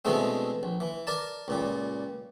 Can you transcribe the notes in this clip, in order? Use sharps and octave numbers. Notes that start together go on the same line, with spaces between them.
B2 D3 E3 G#3 A3 C4
A#1
E3
A#4 D5 A5
C#2 A#2 G3